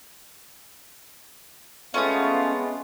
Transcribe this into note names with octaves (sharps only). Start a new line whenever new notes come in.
G#3 A3 B3 C#4 F4 F5 D#6